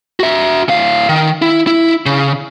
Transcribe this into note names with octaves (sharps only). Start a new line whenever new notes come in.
F#4 E5
A2 F5
D#3
E4
E4
C#3